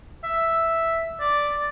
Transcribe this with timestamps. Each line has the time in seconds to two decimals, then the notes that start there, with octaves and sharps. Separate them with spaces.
0.24 E5
1.20 D5